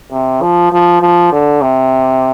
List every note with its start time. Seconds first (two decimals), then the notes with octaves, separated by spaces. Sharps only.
0.12 C3
0.42 F3
0.72 F3
1.02 F3
1.32 D3
1.62 C3